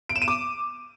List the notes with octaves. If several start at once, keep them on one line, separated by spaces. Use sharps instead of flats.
D7
E7
D#7
D6